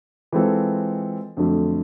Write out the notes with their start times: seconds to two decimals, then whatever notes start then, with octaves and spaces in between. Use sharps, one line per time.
0.33 E3 G#3 C4 F4 A4
1.37 F2 D3 F#3 A3